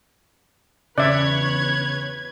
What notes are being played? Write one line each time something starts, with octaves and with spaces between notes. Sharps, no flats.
E2 C#3 B4 C#5 D5 E5 F#6 G#6